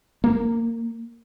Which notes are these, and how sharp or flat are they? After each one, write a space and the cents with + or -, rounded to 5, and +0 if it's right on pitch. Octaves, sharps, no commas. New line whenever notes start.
A#3 -20